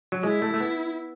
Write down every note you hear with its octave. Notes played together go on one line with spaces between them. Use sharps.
F#3
G#3 E4
A3
A3
B3